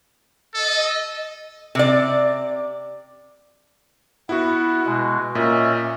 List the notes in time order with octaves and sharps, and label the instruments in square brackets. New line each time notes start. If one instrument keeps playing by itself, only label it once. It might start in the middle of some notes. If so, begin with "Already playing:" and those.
[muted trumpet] A4 [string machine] D#5
[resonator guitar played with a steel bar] C3 D5
[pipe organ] B3 [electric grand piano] E4 F#4
[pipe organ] B2 G#3
[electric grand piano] A#2 [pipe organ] C#4 D#5 E5